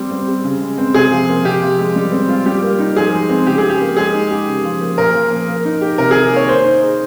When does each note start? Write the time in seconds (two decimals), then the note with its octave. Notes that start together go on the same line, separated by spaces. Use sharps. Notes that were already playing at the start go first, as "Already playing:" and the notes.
Already playing: G3 C4
0.11 C4
0.27 G4
0.44 C#3
0.61 G#3
0.78 C4
0.94 C3 G#4
1.11 F3
1.28 A#3
1.45 C3 G4
1.61 F3
1.79 G#3
1.96 G3
2.12 C4
2.28 F4
2.46 G3 G4
2.62 A#3
2.79 D#4
2.96 F3 G#4
3.13 G#3
3.29 C4
3.46 C#3 G4
3.58 F3 G#4
3.70 G4
3.80 A#3
3.97 G#3 G#4
4.14 D#4
4.31 G4
4.47 C#3
4.64 F3
4.81 A#3
4.98 A#2 A#4
5.14 F3
5.32 A#3
5.48 A#3
5.65 D#4
5.81 G4
5.98 C3 A#4
6.11 D#3 G#4
6.32 A#3 C#5
6.49 A#3 C5
6.65 D#4
6.82 G#4